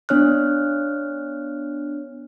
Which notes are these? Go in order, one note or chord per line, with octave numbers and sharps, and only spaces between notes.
B3 D4 C#5 F6 F#6